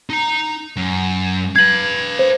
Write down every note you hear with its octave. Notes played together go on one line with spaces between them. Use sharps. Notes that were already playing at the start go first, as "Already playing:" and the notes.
D#4 A#5
F#2
B4 F5 G#6 F#7
C5